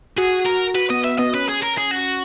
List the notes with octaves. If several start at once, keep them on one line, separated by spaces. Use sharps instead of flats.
F#4 G#4
A#4
F#4 B4
B3 D#5
B3 E5
B3 D#5
C#4 B4
G#4
A#4
G#4
F#4